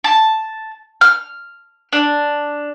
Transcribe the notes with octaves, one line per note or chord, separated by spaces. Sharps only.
A5
F6
D4